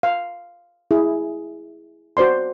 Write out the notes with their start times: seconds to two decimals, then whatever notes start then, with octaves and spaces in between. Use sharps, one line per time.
0.03 F5
0.91 E4 G#4
2.17 F#4 C5 D5 C6